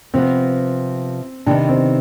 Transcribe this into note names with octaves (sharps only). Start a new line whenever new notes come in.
C3 F3 B3 C4
C3 D#3 B3 D4 D#4
C4